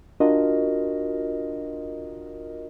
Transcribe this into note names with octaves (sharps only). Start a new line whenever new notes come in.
D4 F4 F#4 A#4 D#5